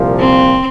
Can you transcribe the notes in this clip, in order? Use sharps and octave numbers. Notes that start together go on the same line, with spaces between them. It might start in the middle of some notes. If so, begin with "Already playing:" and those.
Already playing: C2 A#2 F3
C4